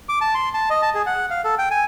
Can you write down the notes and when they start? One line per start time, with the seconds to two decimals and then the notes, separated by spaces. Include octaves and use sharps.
0.09 D6
0.21 A5
0.35 C6
0.54 A5
0.70 D#5
0.82 A5
0.95 G#4
1.06 F#5
1.30 F5
1.45 A4
1.58 G5
1.71 G#5